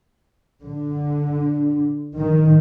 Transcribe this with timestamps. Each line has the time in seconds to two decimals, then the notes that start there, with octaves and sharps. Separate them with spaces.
0.63 D3
2.15 D#3